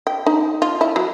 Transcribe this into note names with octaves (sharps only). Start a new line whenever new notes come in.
G5
D#4
F4
E4
F#3